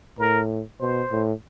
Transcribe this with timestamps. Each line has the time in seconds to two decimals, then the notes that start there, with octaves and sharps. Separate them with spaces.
0.19 A2 A#4
0.80 B2 C5
1.11 A2